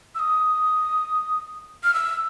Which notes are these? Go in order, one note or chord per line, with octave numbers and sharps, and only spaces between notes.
E6
D#6
F6
E6